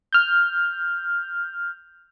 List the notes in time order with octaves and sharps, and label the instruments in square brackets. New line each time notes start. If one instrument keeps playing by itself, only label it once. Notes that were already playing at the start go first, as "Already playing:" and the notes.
[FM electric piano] F6 G6